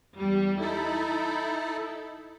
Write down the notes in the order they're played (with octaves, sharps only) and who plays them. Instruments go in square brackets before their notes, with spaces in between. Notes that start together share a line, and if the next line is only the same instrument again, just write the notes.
[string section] E2 G3
[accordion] D#4 A4 [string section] E4